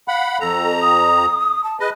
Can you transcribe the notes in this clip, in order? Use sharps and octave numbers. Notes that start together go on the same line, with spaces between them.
F5 F#5 B5
F2 A4 A#5
D#6
A5
G#4 B4 D#5